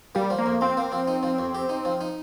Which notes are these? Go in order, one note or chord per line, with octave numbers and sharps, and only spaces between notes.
G3 A#3
F3
A#3
F2
C4 F4
A#3
F3
D#4
F3
F2
G4
D#4
F3
D#4